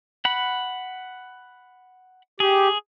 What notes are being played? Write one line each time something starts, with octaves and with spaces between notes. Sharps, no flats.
F#5 B5
G4 G#4